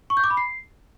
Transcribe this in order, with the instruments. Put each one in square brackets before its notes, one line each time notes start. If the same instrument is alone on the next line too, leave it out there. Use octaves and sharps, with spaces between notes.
[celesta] C#6
G6
D6
B5
C7